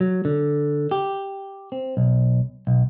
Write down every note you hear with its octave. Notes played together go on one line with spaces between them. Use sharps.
F#3
D3
G4
C4
B1
B1